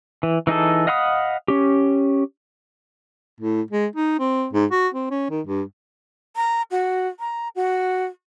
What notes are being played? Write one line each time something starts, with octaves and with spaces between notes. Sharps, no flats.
E3
E3 D#4 G#4 A4
D#5 F5 F#5 B5 D#6
C#4 G4
A2
G#3
D#4
C4
G#2
F#4
C4
C#4
D#3
G2
A#5
F#4
A#5
F#4